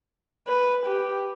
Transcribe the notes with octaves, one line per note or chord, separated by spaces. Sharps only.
B4
G4